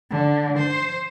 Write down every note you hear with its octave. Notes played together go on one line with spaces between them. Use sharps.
D3
C5